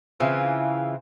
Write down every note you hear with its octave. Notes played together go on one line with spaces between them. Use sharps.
C#3 E3 C4 F4